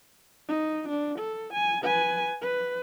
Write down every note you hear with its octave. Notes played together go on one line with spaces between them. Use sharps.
D#4
D4
A4
G#5
B4 G#5
B4